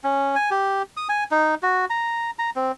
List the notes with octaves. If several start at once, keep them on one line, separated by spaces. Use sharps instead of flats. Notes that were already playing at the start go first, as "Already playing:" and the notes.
C#4
G#5
G4
D#6
G#5
D#4
F#4
A#5
A#5
C4